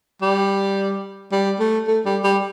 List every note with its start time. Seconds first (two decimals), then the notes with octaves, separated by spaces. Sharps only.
0.22 G3
1.32 G3
1.60 A3
1.87 A3
2.05 G3
2.24 G3